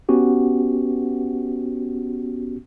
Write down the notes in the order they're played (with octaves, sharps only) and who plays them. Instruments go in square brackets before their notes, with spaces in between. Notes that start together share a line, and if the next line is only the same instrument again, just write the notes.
[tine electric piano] B3 C#4 F#4 G4